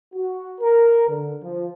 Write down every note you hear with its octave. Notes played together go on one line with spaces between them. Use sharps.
F#4
A#4
D3
F3